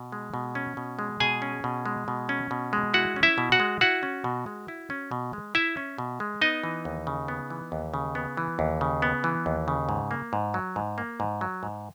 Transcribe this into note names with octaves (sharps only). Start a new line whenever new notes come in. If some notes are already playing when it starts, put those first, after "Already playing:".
Already playing: B2
G#3
B2
C#4
B2
G#3
B2 G#4 G#5
C#4
B2
G#3
B2
C#4
B2
G#3
E4 F#4 F#5
C#4
E4 E5
B2
F#4 F#5
G#3
E4 F#4 F#5
C#4
B2
G#3
E4
C#4
B2
G#3
E4 E5
C#4
B2
G#3
B3 D#4 D#5
E3
D#2
C#3
B3
E3
D#2
C#3
B3
E3
D#2
C#3
B3
E3
D#2
C#3
G#2
A#3
G#2
F#3
G#2
A#3
G#2
F#3
G#2